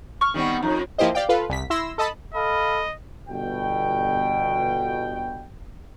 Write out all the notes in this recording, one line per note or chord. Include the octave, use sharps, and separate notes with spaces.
C#6 F6
D#3 G3 B3 C4
F2 D#4
F3 A#3 E4 G4 C5 D#5
G4 D5 F5 G5
F4 A4 B4 F5
C2 B6
E4 C6 E6 A#6
A4 D#5 A5 B5
A4 D#5 F5 B5
G1 B2 G5